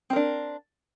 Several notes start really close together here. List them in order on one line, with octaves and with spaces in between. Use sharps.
C4 A#4 D4